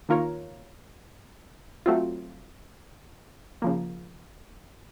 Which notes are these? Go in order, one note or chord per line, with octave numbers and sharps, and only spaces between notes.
D#3 A#3 F4 A#4 C#5
F#3 A3 C4 F4
C#3 F3 A#3